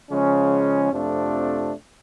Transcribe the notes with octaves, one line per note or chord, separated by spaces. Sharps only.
C#3 F3 G#3 C#4
F2 C3 F3 A3 D4